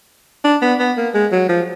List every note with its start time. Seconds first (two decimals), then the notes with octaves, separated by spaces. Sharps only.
0.44 D4
0.62 B3
0.79 B3
0.97 A#3
1.14 G#3
1.32 F#3
1.49 F3